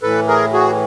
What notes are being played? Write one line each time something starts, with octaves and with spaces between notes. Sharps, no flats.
A2 E3 A4 B4
G#4 A#4
F#4 G#4